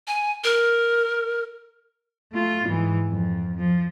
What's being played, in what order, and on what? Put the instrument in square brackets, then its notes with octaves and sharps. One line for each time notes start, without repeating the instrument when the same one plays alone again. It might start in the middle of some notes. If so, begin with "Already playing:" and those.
[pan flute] G#5
A#4
[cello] A3 F4
G#2 E3
F2
F3